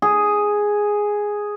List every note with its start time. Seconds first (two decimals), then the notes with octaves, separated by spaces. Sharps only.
0.02 G#4